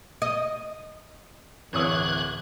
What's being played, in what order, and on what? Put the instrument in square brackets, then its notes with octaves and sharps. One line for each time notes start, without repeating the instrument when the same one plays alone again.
[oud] D#5
[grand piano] D1 C#5 D#6 [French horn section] E3 [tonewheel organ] F#6 G#6